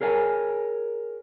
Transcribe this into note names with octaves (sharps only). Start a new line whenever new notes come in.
G#4 A#4 C#5 F5 G#5